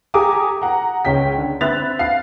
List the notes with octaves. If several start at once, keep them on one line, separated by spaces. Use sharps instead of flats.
G4 A4 G#5 A#5 D6 D#6
F#5 A#5
C#2 C#4 G5 B6
D3
C4 E5 B5 F#6 A6 F7
F5 C7